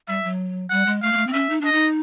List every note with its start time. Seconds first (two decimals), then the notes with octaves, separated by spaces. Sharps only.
0.08 G3 E5
0.24 F#3
0.70 G3 F#5
0.86 G#3
1.02 A3 F5
1.12 A#3
1.17 A3
1.27 C4
1.33 C#4 E5
1.49 D#4
1.61 D4 D#5
1.72 D#4